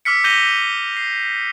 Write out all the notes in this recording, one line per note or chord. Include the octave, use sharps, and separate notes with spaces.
D6 E6 F6 B6 C#7
D6 G6 A#6 D#7 F7 G7
C7